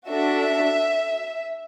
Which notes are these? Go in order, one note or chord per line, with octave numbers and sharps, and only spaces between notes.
D4 F#4 A4 E5